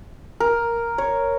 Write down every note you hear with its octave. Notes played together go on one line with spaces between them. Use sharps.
A#4
C#5